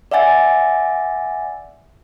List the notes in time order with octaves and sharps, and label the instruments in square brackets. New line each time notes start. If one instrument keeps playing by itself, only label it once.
[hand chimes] D5 E5 F#5 G#5 A6